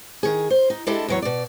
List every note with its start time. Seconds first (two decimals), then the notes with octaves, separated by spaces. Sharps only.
0.23 D#3 G#4
0.50 C5
0.70 D#4
0.87 G#3 D4 E4 G4 A4 D#5
1.08 E2 F#3 C#5
1.22 B2 D5